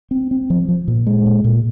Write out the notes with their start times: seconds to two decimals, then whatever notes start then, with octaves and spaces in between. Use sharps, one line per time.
0.11 C4
0.31 C4
0.50 F3
0.68 F3
0.88 A#2
1.07 G#3
1.26 A#2
1.44 A#2